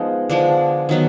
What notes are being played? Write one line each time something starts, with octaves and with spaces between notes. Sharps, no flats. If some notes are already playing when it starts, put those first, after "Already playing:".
Already playing: F3 G#3 B3 D#4
D3 F3 G#3 D4
D#3 F#3 B3